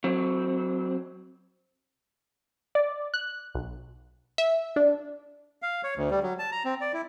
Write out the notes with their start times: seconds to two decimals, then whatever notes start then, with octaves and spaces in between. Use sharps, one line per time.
0.04 F#3 C4
2.75 D5
3.14 F#6
3.55 B1
4.38 E5
4.76 D4
5.62 F5
5.84 C#5
5.96 D2
6.11 G3
6.23 F#3
6.39 A5
6.52 A#5
6.65 C4
6.81 D5
6.93 E4